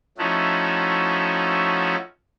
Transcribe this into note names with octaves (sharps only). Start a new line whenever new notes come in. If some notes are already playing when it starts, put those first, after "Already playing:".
F3 A3 C#4 D#4 E4 F#4